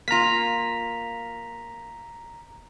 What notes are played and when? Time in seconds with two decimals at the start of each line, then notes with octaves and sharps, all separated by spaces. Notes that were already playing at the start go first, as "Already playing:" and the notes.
0.08 A#3 F4 A#5 B6